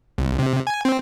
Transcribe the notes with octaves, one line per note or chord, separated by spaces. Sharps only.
C2
C3
G#5
C4